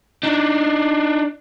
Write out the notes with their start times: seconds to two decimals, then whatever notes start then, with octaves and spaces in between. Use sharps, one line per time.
0.23 D4 D#4